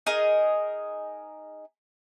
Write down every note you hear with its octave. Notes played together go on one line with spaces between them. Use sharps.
D#4 G#4 A#4 D#5